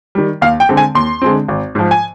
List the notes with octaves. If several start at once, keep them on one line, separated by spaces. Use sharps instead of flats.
D#3 G3
D#2 F5
G5
D3 G#3 C4
G#5
D#2 C6
D3 G#3 C4
G#1
G#2 F3
G#5